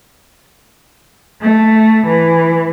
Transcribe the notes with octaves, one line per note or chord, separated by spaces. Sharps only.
A3
E3